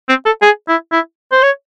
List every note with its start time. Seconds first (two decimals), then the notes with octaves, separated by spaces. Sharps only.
0.09 C4
0.26 A4
0.42 G#4
0.68 E4
0.92 E4
1.32 C5
1.43 C#5